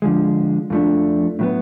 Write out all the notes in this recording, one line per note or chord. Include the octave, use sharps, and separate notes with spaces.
D3 F3 G#3
F2 F3 A3 D4
A2 F#3 B3